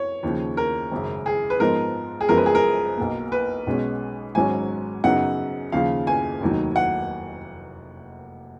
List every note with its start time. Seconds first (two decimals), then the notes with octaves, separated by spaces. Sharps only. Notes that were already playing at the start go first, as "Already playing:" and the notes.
Already playing: C#5
0.23 D#2 C#3 F3
0.57 A#4
0.91 G#1 F#2 C#3
1.26 G#4
1.50 B4
1.60 G#2 F3 G#3 B3 D#4 A#4
2.21 G#4
2.29 F#1 F#2 F3 G#3 B3 A#4
2.37 B4
2.46 G#4
2.55 A#4
2.97 B1 B2 A#3
3.32 B4
3.67 B1 B2 G#3 C#4
4.35 G#1 G#2 F#3 C#4 G#5
5.04 F#2 C#3 F#3 B3 D#4 F#5
5.72 D#2 C#3 F3 F5
6.07 G#5
6.41 F1 D#2 D#3 F#3
6.76 F#5